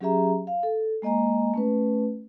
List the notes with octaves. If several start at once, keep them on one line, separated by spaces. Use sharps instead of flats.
F#3 C#4 G4 G#4 E5 A#5
F5
A4
G#3 A#3 D#5 G#5 A#5
A3 C#4 B4